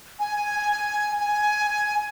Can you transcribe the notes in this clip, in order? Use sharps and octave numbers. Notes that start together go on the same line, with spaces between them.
G#5
G#5